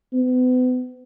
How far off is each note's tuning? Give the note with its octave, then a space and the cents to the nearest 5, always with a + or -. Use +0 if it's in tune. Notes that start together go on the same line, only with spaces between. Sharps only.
B3 +40